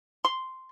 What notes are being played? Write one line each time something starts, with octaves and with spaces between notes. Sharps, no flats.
C6